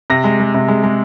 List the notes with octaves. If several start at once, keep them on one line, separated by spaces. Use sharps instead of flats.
C3 A#6
G#3
G#3
C3
G#3
G#3